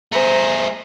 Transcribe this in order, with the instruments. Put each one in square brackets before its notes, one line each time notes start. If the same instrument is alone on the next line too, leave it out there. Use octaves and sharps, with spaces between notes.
[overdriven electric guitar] A3 G#4 [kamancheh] C5 A#5